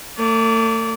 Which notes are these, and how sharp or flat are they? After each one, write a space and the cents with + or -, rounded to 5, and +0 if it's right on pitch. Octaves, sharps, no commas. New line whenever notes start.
A3 +45 D5 -25